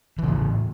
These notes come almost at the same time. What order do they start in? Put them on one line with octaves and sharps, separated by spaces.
E3 C#3 A2